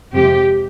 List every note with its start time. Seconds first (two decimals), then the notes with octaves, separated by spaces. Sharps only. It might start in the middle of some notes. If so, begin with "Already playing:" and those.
0.12 F2 C3 F3 G#3 G4